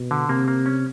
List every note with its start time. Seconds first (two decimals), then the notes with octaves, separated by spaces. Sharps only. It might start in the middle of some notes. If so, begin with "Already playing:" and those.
Already playing: B2
0.11 D3
0.29 C3 A#3
0.48 A#3
0.66 C#4